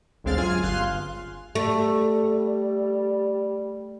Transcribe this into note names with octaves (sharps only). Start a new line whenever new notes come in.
A1 D2 G#3 C4 F5 A6
F#2 F4 G#4 G#5 F6
G1 F5 C6 F#6
G3 A3